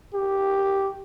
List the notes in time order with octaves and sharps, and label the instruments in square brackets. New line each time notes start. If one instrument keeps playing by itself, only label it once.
[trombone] G4